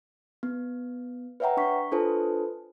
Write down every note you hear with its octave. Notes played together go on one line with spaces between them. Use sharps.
B3
B4 C#5 E5 F#5 G5 A#5
D4 C#6 B6
D4 F4 A4 B4 C5 A5